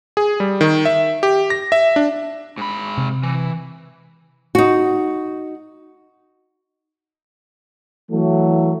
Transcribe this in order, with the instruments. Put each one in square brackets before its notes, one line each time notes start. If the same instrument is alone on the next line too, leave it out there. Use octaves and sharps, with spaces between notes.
[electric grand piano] G#4
G3
D#3
E5
G4
A#6
E5
D4
[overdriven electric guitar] G#2 B5
[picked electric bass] C3
[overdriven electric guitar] E3
[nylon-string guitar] D#4 F#4
[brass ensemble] E3 F#3 A3